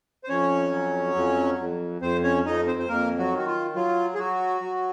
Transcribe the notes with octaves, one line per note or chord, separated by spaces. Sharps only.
C5
F2 C#4 C#5
F#3
F2
F2
F2 C4 C5
C#4 C#5
F2 D#4 D#5
C4 C5
C5
F2 A#3 A#4
F#3 F#4
D#3
F#4
F4
F#3 F4
G#4
F#3 F#4
F#3